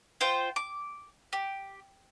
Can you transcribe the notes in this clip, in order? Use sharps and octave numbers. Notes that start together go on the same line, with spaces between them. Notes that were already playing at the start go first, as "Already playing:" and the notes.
F4 C5 G5
D6
G4